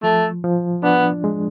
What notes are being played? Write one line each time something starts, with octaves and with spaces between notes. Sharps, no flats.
F3 A3
F3
B3 D4
G#3